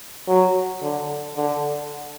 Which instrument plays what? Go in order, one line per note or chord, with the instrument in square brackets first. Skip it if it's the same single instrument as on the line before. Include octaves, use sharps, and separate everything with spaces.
[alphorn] F#3
D3
D3